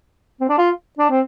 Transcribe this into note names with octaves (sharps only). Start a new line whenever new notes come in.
C4
D4
F4
D4
C4